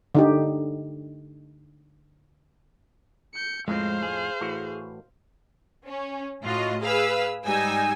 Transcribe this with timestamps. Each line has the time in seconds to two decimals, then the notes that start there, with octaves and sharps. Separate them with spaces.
0.15 D3 D#4 G4
3.34 G6 C#7
3.68 F2 A2 G#3 C4 C5 F5
4.03 G#4
4.41 A2 E3 F#4
5.86 C#4
6.42 A2 F4 F#4 D#5
6.82 G#4 B4 F5 E6
7.46 G#2 G3 D#4 G#5 E6